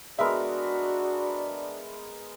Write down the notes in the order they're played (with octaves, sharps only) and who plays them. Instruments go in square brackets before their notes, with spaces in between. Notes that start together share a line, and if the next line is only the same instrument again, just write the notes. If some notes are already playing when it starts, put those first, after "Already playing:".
[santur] G#3 B3 A#4 [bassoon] D4 [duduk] F#4 [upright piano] E5 B5